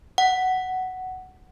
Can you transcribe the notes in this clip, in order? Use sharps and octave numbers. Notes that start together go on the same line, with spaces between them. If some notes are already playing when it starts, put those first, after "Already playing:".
F#5